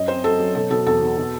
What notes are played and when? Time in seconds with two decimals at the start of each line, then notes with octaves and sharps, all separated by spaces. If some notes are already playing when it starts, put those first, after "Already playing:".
Already playing: F#2 D#5
0.08 C4 C5
0.24 F#3 A4
0.40 F#3
0.55 B2 A4
0.70 B2 A4
0.86 E2 A4
1.02 B2
1.17 B2